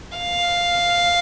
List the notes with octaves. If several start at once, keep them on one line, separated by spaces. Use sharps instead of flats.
F5